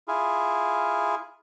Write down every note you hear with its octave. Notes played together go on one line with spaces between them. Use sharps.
E4 F4 G#4